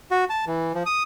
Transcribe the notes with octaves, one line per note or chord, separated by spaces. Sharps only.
F#4
A5
E3
F3
D#6